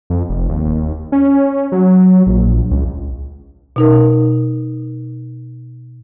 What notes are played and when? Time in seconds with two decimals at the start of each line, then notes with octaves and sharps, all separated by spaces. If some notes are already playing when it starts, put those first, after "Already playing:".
0.10 F2
0.29 F1
0.49 D#2
1.12 C#4
1.72 F#3
2.26 A#1
2.71 C#2
3.76 B2 D#4 A#4